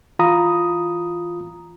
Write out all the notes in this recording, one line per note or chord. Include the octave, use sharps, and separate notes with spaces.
E3 F4 A#5 B5 D#6